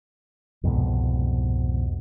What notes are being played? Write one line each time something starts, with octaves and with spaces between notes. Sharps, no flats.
C2 F2 G#2 B2